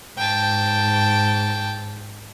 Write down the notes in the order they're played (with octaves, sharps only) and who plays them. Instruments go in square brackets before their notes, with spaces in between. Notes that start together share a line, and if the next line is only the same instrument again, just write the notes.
[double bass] G#2 [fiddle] G5 A5